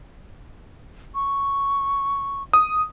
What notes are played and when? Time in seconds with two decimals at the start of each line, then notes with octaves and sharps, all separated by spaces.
1.15 C#6
2.53 D#6